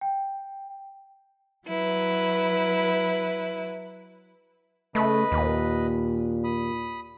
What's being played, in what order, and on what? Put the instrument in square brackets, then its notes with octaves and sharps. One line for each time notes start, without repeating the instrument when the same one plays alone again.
[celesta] G5
[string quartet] F#3 E4 B4
[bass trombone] C#3 [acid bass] A3 [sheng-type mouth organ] B4 D#5 B5
[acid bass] D#2 [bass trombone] A#2
[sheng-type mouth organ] B5 D#6